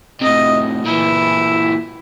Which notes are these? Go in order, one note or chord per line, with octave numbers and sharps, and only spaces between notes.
A2 C3 D#5
A#2 E3 E4